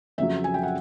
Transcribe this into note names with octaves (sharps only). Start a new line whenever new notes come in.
F2 C#3 F#3 E5
G#5
G5
F#5